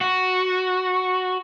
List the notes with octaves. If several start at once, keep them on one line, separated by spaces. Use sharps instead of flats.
F#4